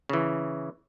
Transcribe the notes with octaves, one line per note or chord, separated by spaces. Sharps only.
C#3 E3